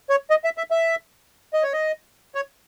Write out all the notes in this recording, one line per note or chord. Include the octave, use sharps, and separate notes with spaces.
C#5
D#5
E5
E5
E5
D#5
C#5
D#5
C#5